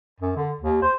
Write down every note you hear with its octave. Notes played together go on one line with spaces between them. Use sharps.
F#2
D3
D#2
C5